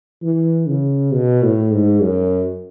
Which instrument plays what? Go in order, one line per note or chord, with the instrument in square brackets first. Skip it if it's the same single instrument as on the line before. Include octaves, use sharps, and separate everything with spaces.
[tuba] E3
C#3
B2
A2
G#2
F#2